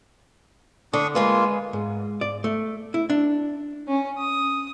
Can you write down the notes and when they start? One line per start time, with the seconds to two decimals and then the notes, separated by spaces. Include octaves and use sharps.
0.93 D3 D4 C#6 D#6
1.15 G#3 A#3 F4 G#4 B4
1.73 G#2
2.21 D5
2.44 A3
2.94 E4
3.10 D4
3.88 C#4
4.18 D#6